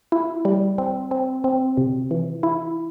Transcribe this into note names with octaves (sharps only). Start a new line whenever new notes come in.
E4
G3
C4
C4
C4
C3
E3
E4